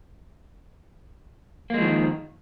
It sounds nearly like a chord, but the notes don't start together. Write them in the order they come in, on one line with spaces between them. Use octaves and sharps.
A#3 G#3 F3 D#3